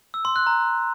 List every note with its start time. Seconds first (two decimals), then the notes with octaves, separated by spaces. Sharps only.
0.14 E6
0.25 C6
0.36 F#6
0.47 A#5